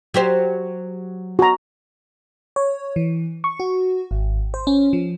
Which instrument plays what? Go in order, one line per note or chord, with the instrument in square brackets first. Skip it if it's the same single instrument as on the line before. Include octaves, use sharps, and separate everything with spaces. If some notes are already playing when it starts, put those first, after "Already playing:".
[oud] F#3 G4 C5
[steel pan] F#4 A#5
[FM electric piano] C#5
E3
C#6
F#4
G#1
C5
C#4
F3